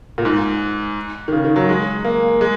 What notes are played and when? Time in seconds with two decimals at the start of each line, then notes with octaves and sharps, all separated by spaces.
0.18 A#2
0.25 G#2
1.28 D#3
1.32 C#3
1.44 D#3
1.56 F#3
1.69 G#3
2.04 A#3
2.41 G#3